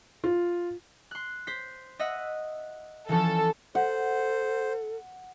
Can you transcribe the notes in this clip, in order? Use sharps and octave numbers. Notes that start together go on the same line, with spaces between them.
F4
C6 F#6
C5 B6
D#5 E5 F#5
E3 F3 C#4 A4
A4 C5 F#5